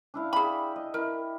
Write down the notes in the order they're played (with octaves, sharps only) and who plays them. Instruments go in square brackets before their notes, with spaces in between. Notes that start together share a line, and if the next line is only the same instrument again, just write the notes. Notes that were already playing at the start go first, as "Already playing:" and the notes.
[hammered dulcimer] D4 E4 F5
[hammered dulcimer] G4 [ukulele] G#4 B5
[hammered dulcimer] D#5
[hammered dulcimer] E4 [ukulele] A#4